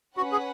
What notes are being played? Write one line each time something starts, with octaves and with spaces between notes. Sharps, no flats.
C#4 F#4 B4 F#5
G#4